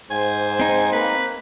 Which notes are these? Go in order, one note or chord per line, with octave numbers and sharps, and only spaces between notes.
G#2 C5 G#5
C4 D#4
A#3 B4